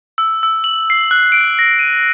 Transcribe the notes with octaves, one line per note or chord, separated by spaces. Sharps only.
E6
E6
F#7
C7
F#6
D7
A#6
D#7